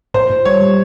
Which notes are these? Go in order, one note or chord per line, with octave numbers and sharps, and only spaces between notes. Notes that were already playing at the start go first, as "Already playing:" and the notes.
A#2 C5
A#2
G3 C#5
G3